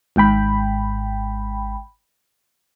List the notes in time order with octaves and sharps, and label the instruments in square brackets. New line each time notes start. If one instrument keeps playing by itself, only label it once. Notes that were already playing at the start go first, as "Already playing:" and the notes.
[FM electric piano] G#1 G#2 G5 B5